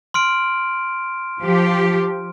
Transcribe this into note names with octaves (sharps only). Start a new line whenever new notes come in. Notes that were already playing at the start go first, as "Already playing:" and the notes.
C6 F6 D7
F3 G4